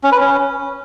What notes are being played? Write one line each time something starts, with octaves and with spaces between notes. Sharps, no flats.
C#4
B4
C#4